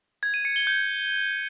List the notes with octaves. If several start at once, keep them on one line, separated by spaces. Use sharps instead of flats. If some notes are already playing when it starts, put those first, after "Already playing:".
G#6
D#7
C#7
G7
G6